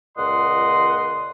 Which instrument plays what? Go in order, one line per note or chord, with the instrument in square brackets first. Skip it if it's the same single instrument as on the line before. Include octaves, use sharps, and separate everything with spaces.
[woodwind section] C#2 A#2 D#5 F#5 C6